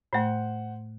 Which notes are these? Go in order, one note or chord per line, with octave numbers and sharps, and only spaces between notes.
A2 A3 C5 F#5